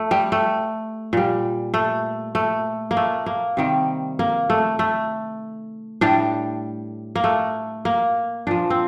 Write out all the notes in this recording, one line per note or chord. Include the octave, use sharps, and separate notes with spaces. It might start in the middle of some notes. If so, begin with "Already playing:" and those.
Already playing: A3
G3
A3
A#2 G3
A3
A3
A#3
A3
A#3
C3 D#3 G3
A#3
A3
A3
A2 G3 D4
A#3
A3
A#3
A#2 F3 D4
C4